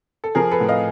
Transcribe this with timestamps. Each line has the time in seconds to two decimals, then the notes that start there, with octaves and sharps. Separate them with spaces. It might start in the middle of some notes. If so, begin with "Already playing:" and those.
0.24 A4
0.35 F3 G#4 A#4
0.51 A4 B4
0.61 A2
0.69 D#5 F5